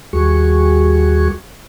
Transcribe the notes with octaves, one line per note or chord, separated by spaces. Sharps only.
D#2 G3 F#4 G#4 C#6